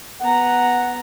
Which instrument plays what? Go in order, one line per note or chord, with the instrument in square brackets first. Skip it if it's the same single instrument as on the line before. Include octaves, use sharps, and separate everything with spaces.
[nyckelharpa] B3 A#5 [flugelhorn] F#5